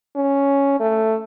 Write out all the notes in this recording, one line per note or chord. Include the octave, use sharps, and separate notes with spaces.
C#4
A3